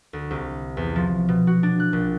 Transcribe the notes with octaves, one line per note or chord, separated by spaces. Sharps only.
D2
C2
E2
F3
B2
F#4
D4
F#6
A#1